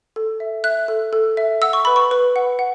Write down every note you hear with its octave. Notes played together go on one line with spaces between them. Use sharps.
A4
E5
E5 F#6
A4
A4
E5
F#5 E6
C#6
B4 B5
C#6
B4
F#5
F#5